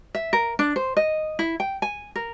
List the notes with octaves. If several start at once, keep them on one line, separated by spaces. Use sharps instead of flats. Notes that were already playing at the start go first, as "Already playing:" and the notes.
E5
A#4
D4
C5
D#5
E4
G5
G#5
A#4